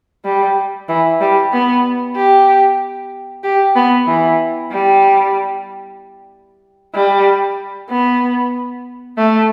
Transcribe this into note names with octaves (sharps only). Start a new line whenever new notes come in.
G3
E3
G3
B3
G4
G4
B3
E3
G3
G3
B3
A3